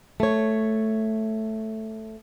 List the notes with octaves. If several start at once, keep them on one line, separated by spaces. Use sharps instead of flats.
A3 C#5